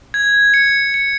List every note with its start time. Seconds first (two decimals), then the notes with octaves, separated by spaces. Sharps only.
0.14 G#6
0.54 C#7
0.94 C#7